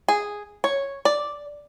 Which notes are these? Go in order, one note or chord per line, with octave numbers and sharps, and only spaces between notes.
G#4
C#5
D5